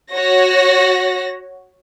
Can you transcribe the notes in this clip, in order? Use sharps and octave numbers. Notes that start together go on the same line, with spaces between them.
F#4 C#5 A#6